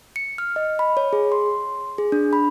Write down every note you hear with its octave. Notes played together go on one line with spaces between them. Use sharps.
C#7
F6
D#5
B5
C#5
G#4
C6
G#4
D4
B5